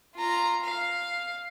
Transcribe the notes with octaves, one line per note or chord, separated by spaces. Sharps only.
F4 A#5
F5